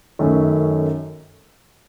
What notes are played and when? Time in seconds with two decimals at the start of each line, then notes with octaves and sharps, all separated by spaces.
0.19 F#2 D#3 A3 C#4